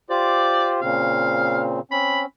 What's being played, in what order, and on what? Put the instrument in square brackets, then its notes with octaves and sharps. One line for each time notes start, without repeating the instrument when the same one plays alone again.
[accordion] F4 G4 C5 [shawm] D5
[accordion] A#2 C#3 C4 [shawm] F5
[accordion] C4 C#4 [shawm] B5